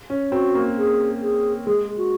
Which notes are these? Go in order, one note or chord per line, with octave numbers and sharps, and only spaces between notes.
C#4
C4 F#4
A#3
G#4
G#4
G#3 G#4
F#4